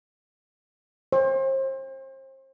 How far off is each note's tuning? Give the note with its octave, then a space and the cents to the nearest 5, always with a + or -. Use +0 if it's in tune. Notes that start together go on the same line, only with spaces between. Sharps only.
C5 +35